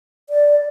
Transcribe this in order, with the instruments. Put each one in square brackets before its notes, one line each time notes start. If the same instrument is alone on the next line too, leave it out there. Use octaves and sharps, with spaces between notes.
[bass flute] D5